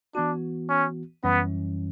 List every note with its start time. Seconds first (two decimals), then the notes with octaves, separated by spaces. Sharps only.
0.15 E3 B3 D4 F#4
0.69 C#4
1.24 F#2 E3 G3 B3 C#4